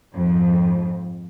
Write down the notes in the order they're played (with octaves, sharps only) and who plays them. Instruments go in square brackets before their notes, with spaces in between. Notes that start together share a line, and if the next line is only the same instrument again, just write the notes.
[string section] F2 G#2